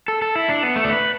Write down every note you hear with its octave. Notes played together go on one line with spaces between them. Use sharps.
A4
A4
E4
D4
B3
A3
D5
B4